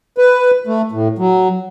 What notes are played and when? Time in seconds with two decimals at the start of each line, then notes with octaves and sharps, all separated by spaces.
0.18 B4
0.67 A3
0.92 A2
1.18 F#3